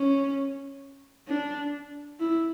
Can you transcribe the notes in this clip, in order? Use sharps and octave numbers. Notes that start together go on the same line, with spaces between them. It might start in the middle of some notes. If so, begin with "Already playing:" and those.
Already playing: C#4
D4
E4